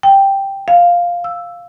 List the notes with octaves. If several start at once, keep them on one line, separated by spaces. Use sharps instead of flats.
G5
F5
E6